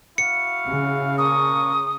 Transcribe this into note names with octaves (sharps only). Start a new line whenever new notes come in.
E4 F#4 F5 C#7
C#3
A#3 D4 C#6 D#6